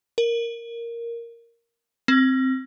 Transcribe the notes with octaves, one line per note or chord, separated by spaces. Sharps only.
A#4
C4